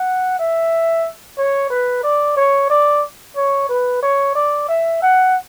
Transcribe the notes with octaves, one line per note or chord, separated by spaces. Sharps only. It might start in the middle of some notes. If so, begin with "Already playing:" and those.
Already playing: F#5
E5
C#5
B4
D5
C#5
D5
C#5
B4
C#5
D5
E5
F#5